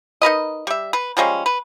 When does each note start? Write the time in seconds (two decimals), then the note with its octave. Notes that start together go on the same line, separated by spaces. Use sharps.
0.22 D#4 A#4 B4 D#5
0.67 G3 E5
0.93 B4
1.17 F3 G3 G#3 C#4
1.46 B4